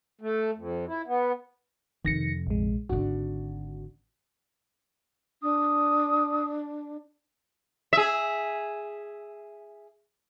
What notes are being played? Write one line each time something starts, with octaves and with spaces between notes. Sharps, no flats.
A3
F2
E4
B3
F2 C3 D#3 A#6 C#7
A#1 G#3
G#1 D3 F#4
D4 D#6
G#4 E5